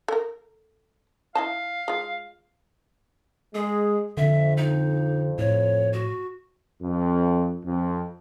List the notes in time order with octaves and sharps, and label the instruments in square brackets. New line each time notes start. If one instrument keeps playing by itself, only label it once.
[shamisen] A4 A#4
[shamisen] E4 D#5 A5 [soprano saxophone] F5
[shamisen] G#3 F4
[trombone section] G#3 [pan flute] G#4
[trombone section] F2 [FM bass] D3 [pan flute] E5
[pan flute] D#4
[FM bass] A2 [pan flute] C#5
[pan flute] F#4
[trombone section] F2
F2